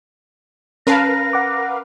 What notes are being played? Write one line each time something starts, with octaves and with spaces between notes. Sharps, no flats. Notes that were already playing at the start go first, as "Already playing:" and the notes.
C#4 A#4 B4 F5 A5 A#6
F#5 D6